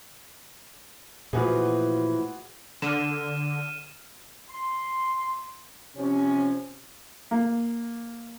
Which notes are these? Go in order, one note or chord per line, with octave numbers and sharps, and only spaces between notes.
A#2 E3 F3 A3 F4 F#4 G#4
D3 F6 D#7 E7
C6
C3 F3 C#4
A#3